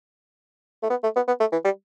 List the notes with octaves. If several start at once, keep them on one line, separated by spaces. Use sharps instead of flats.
A3
B3
A3
B3
B3
A3
E3
G3